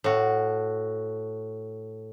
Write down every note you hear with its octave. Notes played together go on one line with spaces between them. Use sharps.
A2 F#4